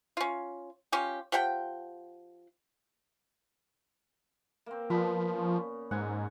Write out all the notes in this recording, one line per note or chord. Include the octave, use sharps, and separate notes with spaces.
C#4 F4
C#4 F4 G4
F3 G4 F#5 G5
A#3 C4
A#2 F3 B3 B5
C#4
G#2 F#5 G#5